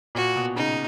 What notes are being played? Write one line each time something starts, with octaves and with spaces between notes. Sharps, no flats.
A#2 F#4
B2
C#3 D#4